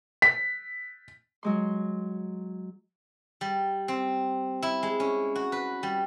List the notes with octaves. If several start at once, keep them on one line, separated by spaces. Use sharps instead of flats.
B6
F#3 G#3 C6
G3
C4
E4
G#3
C#4
F#4
B4
G3